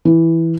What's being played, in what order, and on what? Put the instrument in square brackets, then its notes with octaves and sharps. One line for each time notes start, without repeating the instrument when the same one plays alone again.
[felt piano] E3